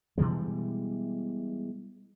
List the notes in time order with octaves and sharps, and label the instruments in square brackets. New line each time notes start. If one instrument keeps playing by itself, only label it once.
[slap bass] B2 E3 G3 G#3